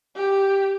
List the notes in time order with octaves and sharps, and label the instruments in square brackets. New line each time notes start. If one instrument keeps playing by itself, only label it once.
[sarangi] G4